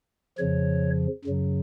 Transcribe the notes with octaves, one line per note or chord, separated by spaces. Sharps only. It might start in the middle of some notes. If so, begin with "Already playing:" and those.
F2 C#3 F3 C#5
F#2 C#3 F#3